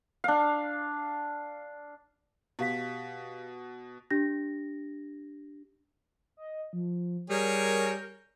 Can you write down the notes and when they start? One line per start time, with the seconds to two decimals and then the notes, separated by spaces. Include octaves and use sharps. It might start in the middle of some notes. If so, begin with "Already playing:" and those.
0.24 D4 F5
2.59 B2 G4 F5 B6
4.11 D4 G4 A#6
6.37 D#5
6.73 F3
7.30 G3 G#4 A#4 C#5 G6